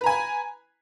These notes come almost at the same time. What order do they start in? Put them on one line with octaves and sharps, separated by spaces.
B4 A#5 G#5 B5